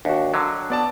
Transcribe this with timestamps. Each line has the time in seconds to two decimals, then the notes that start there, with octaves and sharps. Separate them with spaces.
0.05 D#2 D4 F#4
0.34 D3 F#3
0.70 B3 D5 A5